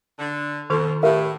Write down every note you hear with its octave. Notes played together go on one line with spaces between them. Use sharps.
D3
F2 B2 D#3 A4 C6
A2 G4 A#4 E5 F5